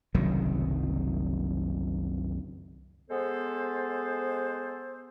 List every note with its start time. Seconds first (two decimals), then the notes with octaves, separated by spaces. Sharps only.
0.14 F#1 C2 D#3 F#3
3.10 G#3 B3 A4 C5